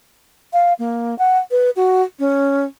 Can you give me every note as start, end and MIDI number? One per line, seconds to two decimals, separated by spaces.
0.53 0.73 77
0.79 1.17 58
1.19 1.39 78
1.51 1.70 71
1.76 2.03 66
2.19 2.65 61